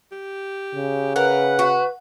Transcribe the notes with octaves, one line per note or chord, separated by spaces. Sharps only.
G4
C#3
A#4 B4 F#5
F#4